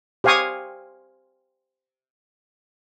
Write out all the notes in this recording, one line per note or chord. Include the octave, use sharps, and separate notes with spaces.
G4 C5 F5 G#5 C#6 D#6